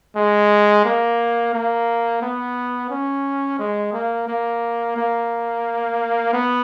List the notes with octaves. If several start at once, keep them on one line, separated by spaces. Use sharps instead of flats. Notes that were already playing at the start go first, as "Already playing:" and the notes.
G#3
A#3
A#3
B3
C#4
G#3
A#3
A#3
A#3
B3